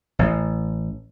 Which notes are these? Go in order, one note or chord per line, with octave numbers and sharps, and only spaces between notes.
A1